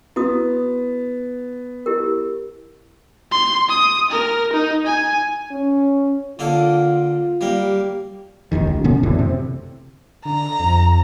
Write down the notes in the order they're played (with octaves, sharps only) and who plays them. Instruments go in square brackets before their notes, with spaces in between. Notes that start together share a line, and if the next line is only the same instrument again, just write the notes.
[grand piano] B3 [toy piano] E4 F#4 D#6
[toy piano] E4 G4 A#4
[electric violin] C6
D#6
A#4
D#4
G#5
[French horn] C#4
[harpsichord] D3 A#3 A4 [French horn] F4
[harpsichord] G3 A#3
[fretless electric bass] E1 A#1 D#2 D#3
C#2
B2 D3 B3 C#4
F#2 A2 D3 E3
C3
[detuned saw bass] D3 [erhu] A#5
[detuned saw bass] F2